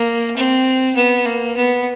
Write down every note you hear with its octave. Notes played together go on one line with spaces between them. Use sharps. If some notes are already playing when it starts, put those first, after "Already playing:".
Already playing: A#3
C4
B3
A#3
B3